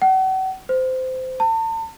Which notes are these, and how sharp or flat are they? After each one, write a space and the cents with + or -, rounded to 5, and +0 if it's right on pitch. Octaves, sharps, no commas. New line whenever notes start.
F#5 +40
C5 -20
A5 +40